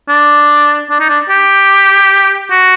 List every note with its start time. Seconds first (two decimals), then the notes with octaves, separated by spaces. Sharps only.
0.08 D4
0.90 D4
1.00 D#4
1.09 D4
1.29 G4
2.50 F#4